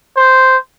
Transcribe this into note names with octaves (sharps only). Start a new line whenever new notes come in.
C5